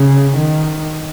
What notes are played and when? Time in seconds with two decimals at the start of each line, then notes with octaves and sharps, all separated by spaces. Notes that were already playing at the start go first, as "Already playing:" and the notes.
Already playing: C#3
0.36 D#3